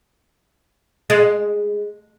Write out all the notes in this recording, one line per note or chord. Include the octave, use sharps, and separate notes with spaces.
G#3